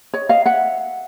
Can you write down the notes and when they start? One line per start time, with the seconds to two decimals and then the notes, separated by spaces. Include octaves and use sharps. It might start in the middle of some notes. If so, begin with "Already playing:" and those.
0.14 C#5 D#5
0.29 D#5 F5
0.46 E5 F#5